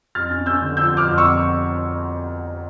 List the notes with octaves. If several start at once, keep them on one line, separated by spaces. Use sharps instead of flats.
F2 F6 A6
C#4
C#4 E6 G6
D3
F3 E6 G6
F3
D6 F6
F2
C#6 E6